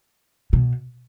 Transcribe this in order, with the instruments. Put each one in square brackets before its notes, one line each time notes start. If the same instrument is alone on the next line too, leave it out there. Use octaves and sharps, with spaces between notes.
[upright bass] B2